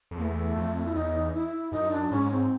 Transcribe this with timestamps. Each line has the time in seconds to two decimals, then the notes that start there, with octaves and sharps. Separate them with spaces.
0.11 F2
0.17 E2 A#3
0.23 A3
0.56 F2
0.86 E4
0.95 E2 D#4
1.34 E4
1.72 F#2 D#4
1.91 D4
2.11 G#2 C#4
2.31 C4